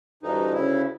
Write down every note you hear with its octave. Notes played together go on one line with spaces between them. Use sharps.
D2 G2 E3 D#4
C#3 E4